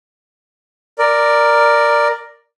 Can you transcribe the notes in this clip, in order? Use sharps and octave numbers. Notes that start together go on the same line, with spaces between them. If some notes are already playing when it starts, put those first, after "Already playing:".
A#4 D5